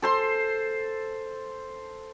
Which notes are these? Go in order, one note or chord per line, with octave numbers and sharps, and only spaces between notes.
A4 C5 C6